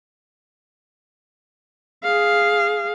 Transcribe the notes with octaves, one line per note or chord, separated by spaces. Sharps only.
G#4 F5